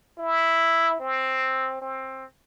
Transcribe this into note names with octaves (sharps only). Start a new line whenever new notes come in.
E4
C4
C4